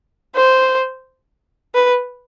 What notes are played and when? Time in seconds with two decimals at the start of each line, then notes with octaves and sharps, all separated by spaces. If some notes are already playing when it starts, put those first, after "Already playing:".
0.35 C5
1.75 B4